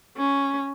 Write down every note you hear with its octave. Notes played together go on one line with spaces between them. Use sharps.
C#4